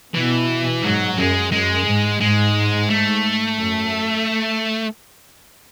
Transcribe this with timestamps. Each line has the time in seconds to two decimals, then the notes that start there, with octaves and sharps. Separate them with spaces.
0.15 B2 E3
0.83 G#2 F#3
1.17 F#2 G#3
1.52 F#2 G#3
1.86 G#2
2.20 G#2 G#3
2.90 A3
3.58 F#2